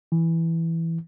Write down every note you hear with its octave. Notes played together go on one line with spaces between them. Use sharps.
E3